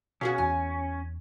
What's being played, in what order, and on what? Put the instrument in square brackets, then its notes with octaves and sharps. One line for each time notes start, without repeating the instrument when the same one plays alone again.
[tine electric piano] B2 [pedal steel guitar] C#4 [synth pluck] F#4 G#4 F5
[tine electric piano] E2 [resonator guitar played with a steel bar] G#5